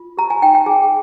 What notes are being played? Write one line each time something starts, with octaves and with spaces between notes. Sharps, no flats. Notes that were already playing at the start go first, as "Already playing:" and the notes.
Already playing: F4
G4 A#5
G#5
D#4 G5
G5
G#4 G#5